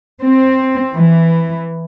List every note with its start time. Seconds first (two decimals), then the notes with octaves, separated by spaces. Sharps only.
0.23 C4
0.94 E3